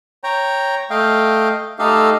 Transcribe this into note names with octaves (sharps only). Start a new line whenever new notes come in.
C#5 G5 A#5
A3 D#5 F5 G5
A3 D#4 G4 A4 D#5 F5